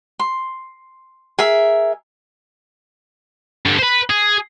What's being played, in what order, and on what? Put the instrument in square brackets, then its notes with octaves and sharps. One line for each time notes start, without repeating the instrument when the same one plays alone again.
[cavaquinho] C6
G#4 A#4 E5
[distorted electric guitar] G2 D3
B4 C5
G#4